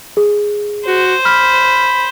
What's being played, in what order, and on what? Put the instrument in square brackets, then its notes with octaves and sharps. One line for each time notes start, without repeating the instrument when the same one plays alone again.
[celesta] G#4
[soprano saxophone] F#4 [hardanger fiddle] C5
[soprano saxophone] B5 [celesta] F6